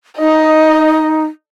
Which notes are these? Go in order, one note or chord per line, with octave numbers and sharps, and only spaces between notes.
D#4 D#5